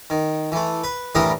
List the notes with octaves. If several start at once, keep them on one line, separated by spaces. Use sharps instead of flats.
D#3
E3 A3
B4
A2 E3 G3 D4 A#4 D#6